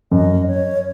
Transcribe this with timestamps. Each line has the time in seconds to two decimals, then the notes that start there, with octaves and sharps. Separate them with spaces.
0.11 F#2 D#5
0.47 C#5